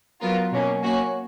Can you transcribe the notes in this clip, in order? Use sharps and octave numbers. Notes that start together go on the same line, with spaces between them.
F#3 B3 F4 A#4
B2 F#3 A#3 C#4
A#3 C#4 F#4